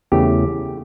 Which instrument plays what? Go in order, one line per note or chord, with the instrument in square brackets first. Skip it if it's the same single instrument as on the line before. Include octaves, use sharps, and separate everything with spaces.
[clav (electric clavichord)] E2 C#3 E3 A3 G4